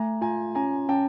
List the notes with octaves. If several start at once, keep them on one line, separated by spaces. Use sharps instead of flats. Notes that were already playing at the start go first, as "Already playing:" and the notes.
Already playing: A3 G#5 A#5
F4 G#5 A#5
C#4 G#5 A#5
C#4 G5 A5